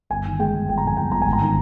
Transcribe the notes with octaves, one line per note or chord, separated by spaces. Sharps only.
G1 G#5
D#3
G#3 G5
G1
G1 G5
A#5
F2 G#5
G1 G5
G1 A#5
G#1 G#5
A#5
D#3